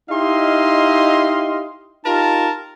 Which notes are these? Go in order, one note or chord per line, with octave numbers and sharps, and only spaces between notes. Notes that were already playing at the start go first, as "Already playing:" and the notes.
D#4 E4 G4 D#5 F5 C6
D#4 F4 G4 A#4 A5